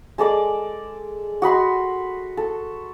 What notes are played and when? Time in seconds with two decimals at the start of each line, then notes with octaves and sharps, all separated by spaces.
0.18 G#3 A4 D5 D6
1.42 F#4 D#5 B5 C6
2.37 A4